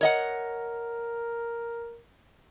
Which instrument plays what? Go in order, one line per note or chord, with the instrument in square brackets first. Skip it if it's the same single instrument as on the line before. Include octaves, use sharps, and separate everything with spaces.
[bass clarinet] A#4 [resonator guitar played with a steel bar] C#5 D#5 F#5